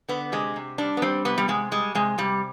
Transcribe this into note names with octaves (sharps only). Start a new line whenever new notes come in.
D3 B3
C3 G#3
C3
G3 D4
B3
G3 C4
C3 B3
G3
C3 G#3
G3 G#3
C3 G#3
C3 G3